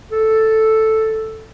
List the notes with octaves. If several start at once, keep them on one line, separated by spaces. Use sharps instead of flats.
A4